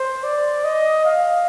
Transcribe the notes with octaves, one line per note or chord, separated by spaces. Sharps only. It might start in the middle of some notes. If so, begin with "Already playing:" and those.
Already playing: C5
D5
D#5
F5